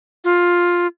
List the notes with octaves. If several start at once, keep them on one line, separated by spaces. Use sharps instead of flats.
F4